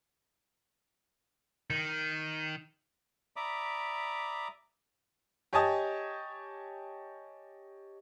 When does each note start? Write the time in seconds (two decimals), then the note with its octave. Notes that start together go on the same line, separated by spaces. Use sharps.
1.70 D#3
3.36 D5 E5 A#5 B5 D6 D#6
5.53 G4 C#5 D#5 G#5 A5 D#6